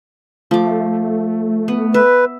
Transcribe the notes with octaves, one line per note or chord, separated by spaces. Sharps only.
F3 A3 D6
B3
B4 E5